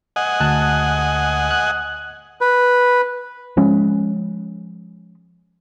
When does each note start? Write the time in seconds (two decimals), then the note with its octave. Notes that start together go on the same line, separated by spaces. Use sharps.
0.16 D#5 F#5 G#5
0.40 D2 A5 F#6
1.51 F#6
2.41 B4
3.57 F3 G#3 C#4